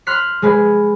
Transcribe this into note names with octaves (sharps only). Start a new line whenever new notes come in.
C6 F6 F#6 B6 C7
G#3 G#4 B4